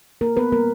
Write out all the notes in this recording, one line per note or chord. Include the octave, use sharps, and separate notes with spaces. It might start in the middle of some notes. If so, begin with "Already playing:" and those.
A#3 A#4
A#3 B3 B4
G3 A#3 A#4